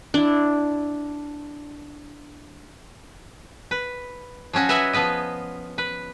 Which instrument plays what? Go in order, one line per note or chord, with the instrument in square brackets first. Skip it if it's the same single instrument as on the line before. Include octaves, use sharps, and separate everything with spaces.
[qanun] D4 E4
[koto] B4
F3 F#3 C#4 F#4
B4 D#5 E5 F#5 G#5 A#5
F3 B3 B4 D#5
B4